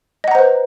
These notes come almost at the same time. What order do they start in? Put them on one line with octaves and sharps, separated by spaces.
D#5 F#5 A#5 C5 B4